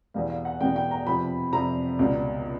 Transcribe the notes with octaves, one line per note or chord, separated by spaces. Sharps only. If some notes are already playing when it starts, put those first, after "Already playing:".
E2 B2 G3 F5
F5
F#5
E2 B2 G3 G5
G5
A#5
F2 C3 F3 B5
F2 C3 F3 A#5
C#2 B2 G3